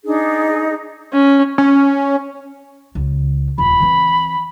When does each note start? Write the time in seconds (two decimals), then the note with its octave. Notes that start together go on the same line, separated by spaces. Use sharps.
0.05 D4 D#4 G#4
1.14 C#4
1.58 C#4
2.95 C#2
3.58 D#1 F4 B5
3.80 E3 C4